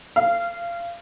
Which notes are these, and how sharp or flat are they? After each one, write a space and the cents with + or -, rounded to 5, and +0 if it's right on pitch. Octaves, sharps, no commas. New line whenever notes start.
F5 -25